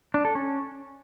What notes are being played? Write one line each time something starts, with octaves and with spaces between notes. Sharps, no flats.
D4
A4
C#4